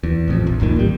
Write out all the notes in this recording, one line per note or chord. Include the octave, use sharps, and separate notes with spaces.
E2
A1 F2
A#1
D#1 G#1 A#2 D#3
A1 G3